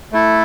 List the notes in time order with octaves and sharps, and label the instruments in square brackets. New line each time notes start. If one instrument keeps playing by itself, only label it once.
[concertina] A3 E4 A4